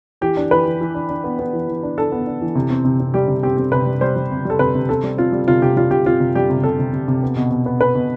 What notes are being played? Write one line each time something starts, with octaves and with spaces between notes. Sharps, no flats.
E3 G4
D4
E3 B4
E3
E3
D4
D4
B3
B3
E3
E3
D4
D4 A4
B3
D4
E3
C3
C4
C3
C4
G3 G4
C3
C4 G4
C4
C3 B4
G3
G3 C5
G3
C3
G3 A4
C3 B4
C3
C4 A4
G3
C4 F4
G3
C3 F4
C3 G4
G3 F4
C3 G4
C4 F4
C3
G3 G4
C3
C3 A4
C3
C3
C3
B3
B2
B2
B3
B3 B4
B2